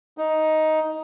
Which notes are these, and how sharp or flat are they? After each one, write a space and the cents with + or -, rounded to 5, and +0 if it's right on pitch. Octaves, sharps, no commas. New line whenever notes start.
D#4 +10